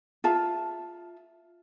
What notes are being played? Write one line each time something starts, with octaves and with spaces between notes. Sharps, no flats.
F4 G#4 E5 A5